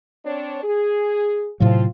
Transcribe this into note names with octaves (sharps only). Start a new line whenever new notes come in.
C4 D4 C#5
G#4
A2 C3 F3 F#3 C4 F4